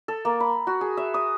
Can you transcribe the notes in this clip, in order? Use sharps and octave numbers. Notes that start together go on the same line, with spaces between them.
A4
A#3
B5
F#4
G#4
E5
D#6